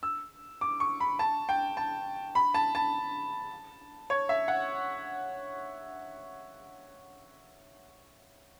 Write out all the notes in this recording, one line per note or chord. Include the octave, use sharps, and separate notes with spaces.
E6
D6
C#6
B5
A5
G5
A5
B5
A5
A5
C#5
E5
F#5